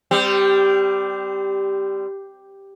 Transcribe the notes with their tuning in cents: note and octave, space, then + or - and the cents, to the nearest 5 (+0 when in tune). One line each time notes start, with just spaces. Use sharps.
G3 +0 C4 -25